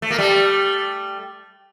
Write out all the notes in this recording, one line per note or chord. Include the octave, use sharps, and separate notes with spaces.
A3
A#3
G3 A3